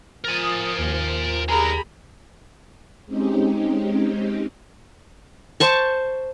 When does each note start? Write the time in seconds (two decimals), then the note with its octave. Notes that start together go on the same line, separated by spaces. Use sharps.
0.25 F3 A#4 G#5 D#6 A6
0.78 D#2
1.49 D3 G#3 G4 G#4 A#4 B5
3.06 G#3 C4 C#4 D#4 G4
5.60 C5 A5 C#6